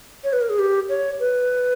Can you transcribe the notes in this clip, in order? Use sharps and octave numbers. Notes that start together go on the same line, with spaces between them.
C#5
B4
A#4
G#4
G4
C#5
B4